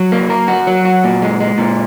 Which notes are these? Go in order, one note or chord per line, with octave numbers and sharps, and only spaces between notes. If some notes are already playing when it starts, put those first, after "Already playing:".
Already playing: F#3
A#3
A#4
F#4
F#3
F#4
A#2
G#3
G#3
A#2